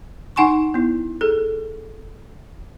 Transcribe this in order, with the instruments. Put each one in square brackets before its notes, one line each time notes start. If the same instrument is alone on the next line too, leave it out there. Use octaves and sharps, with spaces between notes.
[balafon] D#4 F#5 G#5 C6 C#6
B3 E4
G#4 A4